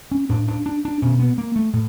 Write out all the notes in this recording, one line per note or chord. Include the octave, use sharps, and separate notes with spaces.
C#4
A2 D4
D4
D4
D4
B2 C#4
B3
A#3
A3
A2